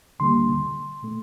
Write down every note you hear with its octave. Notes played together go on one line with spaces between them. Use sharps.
D2 D3 G3 A#3 C6
A#2 A3